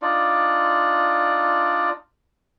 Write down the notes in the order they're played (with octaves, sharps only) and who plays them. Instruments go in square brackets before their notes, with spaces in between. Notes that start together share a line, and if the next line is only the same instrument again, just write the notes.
[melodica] D4 D#4 F4 D5